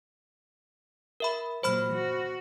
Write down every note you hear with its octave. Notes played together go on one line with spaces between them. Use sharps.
A#4 E5 B5
A#2 F#3 C5 B5 F6
F#4